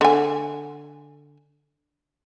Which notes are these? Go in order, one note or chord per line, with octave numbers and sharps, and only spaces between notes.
D3 G#5